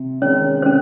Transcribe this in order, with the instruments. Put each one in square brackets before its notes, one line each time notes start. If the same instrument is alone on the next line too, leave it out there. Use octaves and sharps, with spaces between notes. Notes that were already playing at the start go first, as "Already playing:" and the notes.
Already playing: [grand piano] C3
[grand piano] D#3 G#3 [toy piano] C#4 C#5
[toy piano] C5
[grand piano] C3 [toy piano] C#4